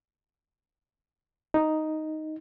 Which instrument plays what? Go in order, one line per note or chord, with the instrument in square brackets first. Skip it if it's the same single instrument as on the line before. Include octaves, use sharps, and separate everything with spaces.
[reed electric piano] D#4